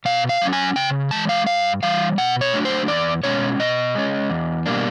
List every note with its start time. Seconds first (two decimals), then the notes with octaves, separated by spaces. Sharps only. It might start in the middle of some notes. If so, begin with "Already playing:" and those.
0.05 B2 F5
0.29 F5
0.42 F#3 A#3 C#4
0.53 G#5
0.76 C#3 G5
1.11 E3 G#3 A5
1.29 F5
1.47 G2 F5
1.83 E3 G3 F5
2.18 B2 F#5
2.41 C#5
2.54 F#3 A3 D4
2.65 C5
2.88 E2 D5
3.24 B2 G#3 C#4 C#5
3.59 B2 D#5
3.95 G#3 C#4
4.30 E2
4.66 B2 G3 A#3 D4